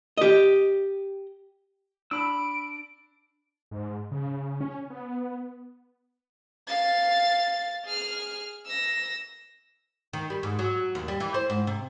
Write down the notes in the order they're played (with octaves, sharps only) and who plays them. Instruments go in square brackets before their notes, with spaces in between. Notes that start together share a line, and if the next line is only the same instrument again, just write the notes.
[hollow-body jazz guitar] G4 D#5
[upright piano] D4 [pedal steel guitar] B5 E6 [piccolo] D7
[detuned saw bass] G#2
C#3
C#4
B3
[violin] F5 A6
G#4 F6
E6 A#6
[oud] D#3
G3
G#2
F#3
D#2
G3
E3
C5
G#2
C3